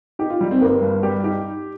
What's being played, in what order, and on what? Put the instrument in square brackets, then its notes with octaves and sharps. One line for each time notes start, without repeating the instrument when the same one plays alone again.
[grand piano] D#4 [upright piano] G4
[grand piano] F4
[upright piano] G3 [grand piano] D#4
[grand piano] C4
[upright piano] G1 [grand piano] A#3
[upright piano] G2
[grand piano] G3 [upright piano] G4
[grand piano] D#4 [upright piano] G4